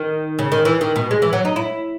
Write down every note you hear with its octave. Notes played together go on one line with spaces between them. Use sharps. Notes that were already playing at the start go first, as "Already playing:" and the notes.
Already playing: D#3
C#3
D#3
E3
D#3
B2
G#3
E3
F#3
D#4
E4